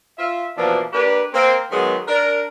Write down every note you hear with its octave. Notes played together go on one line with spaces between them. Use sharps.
F4 E5
B2 E3 F3 A#3 D4
A#3 D4 G4 B4
A#3 C4
D#3 F#3 G#3 B3
D4 A#4